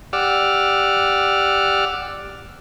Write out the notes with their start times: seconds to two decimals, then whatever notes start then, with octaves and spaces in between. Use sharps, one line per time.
0.13 G4 D5 F#5 D6 E6 F6